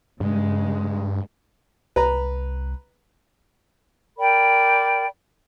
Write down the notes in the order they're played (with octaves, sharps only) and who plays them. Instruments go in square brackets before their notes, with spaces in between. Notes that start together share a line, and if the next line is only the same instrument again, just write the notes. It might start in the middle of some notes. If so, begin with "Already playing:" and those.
[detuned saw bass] G2 [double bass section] C#3 G#3
[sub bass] C2 [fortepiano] B4 A#5
[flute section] A#4 D5 G5 B5